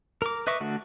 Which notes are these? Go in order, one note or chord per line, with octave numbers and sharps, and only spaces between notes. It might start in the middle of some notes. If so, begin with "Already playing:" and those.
A#4 D6
B4 D#5 E5 C#6 D6
D3 A3 F#4